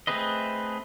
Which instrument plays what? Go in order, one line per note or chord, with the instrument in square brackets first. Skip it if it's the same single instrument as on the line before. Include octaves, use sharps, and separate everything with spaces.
[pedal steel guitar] A3 C4 G#4 B4 D#5